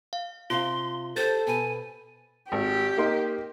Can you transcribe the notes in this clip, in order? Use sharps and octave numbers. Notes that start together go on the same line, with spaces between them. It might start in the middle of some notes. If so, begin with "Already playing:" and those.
F5
C3 F4 F5 C6
G4 A4 C5 A6
B2 B4 G#5
G#1 G4
A#3 D#4 C6